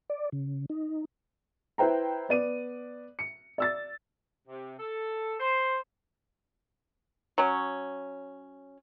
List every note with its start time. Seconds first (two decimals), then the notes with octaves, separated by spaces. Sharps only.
0.10 D5
0.32 C#3
0.70 D#4
1.78 E4 B4 C5 G5 A#5
2.29 B3 D5 D#7
3.19 C#7
3.58 D5 E6 A6
4.48 C3
4.79 A4
5.40 C5
7.38 F#3 C#4